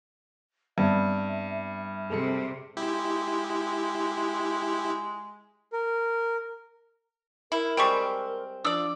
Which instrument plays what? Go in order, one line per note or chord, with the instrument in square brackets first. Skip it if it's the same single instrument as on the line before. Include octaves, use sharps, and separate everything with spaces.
[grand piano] G2 [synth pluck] G3 B3 C4 [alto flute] E5
[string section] C3 [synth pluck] G#4 A4 C#7
[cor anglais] G#3 [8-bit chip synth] E4 G4
[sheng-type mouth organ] A#4
[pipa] E4 [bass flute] A#4
[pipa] G3 G#3 C4 [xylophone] G5 C#6
[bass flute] F3 [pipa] D4 D5 [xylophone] D#6 E6